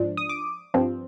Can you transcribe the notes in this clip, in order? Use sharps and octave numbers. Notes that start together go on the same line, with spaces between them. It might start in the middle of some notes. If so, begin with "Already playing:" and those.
Already playing: G#2 F3 D4
D#6
D6
G2 F3 C4